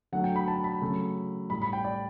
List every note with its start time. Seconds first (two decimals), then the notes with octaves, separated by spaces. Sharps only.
0.12 D3 F#3 A3 F#5
0.24 G5
0.36 B5
0.48 A5
0.64 B5
0.82 C#3 F#3 A3
1.50 A2 G3 B5
1.62 B5
1.73 G5
1.85 D5